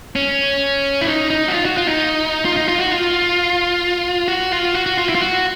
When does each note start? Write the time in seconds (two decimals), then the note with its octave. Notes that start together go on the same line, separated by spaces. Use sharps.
0.16 C#4
1.01 E4
1.08 D#4
1.30 D#4
1.48 F#4
1.53 F4
1.65 F#4
1.77 F4
1.87 D#4
2.45 F4
2.56 D#4
2.68 F4
2.79 F#4
2.91 F4
4.28 F#4
4.52 F4
4.74 F#4
4.86 F#4
4.98 F4
5.09 E4
5.15 F4
5.21 F#4